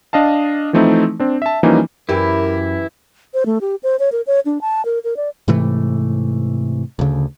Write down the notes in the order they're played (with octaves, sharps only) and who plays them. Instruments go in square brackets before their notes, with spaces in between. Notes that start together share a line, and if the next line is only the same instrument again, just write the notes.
[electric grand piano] D4 D#5 F5 A5
E3 F3 A3 C4 D#4 E4
C4 D4
E5 A5
E3 F3 G3 A#3 C#4 D#4
[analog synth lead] F#2 [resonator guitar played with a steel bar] E3 G4 B4 [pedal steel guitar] E4 [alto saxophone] A#4
[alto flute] C5
A3
G4
C5
C#5
A#4
C#5
D4
A5
A#4
A#4
D5
[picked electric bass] G#2 C3 E3 A3
D2 C#3